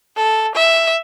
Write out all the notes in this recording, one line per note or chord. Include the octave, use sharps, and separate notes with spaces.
A4
E5